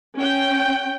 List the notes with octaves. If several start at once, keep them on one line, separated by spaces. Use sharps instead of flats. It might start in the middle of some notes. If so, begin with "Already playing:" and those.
C#4 G5